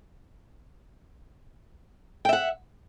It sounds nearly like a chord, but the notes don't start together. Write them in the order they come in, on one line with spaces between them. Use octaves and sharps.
G5 E5 F#5